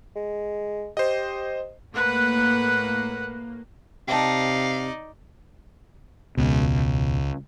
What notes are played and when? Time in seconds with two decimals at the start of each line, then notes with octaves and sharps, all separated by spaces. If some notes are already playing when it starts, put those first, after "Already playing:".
0.16 G#3
0.97 G4 C5 D#5
1.95 A2 A#3 B4 F#5
4.08 C3 D#4 D5 F5 G5 A5
6.37 E1 C#2 B2